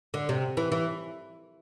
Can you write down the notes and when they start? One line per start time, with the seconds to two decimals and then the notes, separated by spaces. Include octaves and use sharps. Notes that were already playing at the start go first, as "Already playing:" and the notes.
0.14 D3
0.29 C3
0.57 E3
0.72 E3